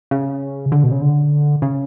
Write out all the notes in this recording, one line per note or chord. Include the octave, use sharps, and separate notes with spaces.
C#3
D3
B2
C#3
D3
C#3